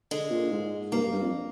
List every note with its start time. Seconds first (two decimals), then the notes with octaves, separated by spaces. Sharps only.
0.11 D3 G#3
0.30 A#2
0.52 G#2
0.92 G2 A#3
1.02 G2
1.13 G2
1.22 F2